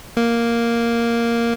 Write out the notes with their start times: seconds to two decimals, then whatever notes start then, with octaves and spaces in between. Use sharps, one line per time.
0.17 A#3